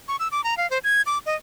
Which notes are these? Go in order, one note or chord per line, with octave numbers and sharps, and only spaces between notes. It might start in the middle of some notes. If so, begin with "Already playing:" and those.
C#6
E6
D6
A#5
F5
C5
G#6
D6
D#5